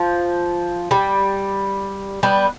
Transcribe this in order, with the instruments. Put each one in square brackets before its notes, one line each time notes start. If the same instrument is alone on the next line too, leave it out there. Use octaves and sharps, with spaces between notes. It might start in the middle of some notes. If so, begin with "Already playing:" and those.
Already playing: [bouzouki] F3
G3
G3 B3